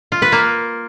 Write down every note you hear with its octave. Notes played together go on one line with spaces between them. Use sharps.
F4
B4
A#3